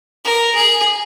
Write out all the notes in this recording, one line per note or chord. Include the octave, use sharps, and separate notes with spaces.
A#4
G#4